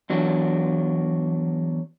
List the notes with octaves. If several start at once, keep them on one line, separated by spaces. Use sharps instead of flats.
E2 F#3 D4